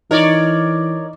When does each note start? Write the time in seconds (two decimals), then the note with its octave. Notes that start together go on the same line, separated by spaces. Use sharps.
0.11 E3 D#4 A#4 C#5 D5